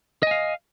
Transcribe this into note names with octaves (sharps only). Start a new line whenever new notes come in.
D#5 F5 G#5